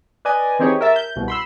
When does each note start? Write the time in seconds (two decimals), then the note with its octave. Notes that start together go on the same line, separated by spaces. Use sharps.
0.25 B4 D5 D#5 G#5
0.59 E3 C4 D#4 G4 G#4 C#5
0.81 A#4 E5 A5
0.96 G6
1.16 C2 G2 B2
1.28 B5 C6 E6